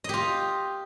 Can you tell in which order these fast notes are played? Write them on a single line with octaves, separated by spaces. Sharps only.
D#5 G4 F4